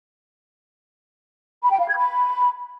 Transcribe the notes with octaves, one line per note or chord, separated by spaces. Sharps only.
B5
G5
F5
G#6
B5